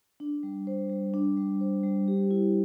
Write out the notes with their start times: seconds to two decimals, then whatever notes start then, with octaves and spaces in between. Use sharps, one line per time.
0.20 D4
0.43 G3
0.67 C5
0.90 G3
1.14 D4
1.37 G3
1.61 C5
1.83 G3
2.08 G4
2.31 E4